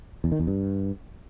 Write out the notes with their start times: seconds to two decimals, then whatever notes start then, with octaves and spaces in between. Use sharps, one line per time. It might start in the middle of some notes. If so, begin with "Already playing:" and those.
0.24 E2
0.32 D#3
0.40 E2
0.47 G2